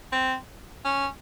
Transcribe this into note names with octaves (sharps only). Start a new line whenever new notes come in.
C4
C#4